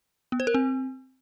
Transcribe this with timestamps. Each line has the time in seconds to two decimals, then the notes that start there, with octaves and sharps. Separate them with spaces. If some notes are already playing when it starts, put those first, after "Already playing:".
0.32 B3
0.40 C5
0.47 A#4
0.54 C4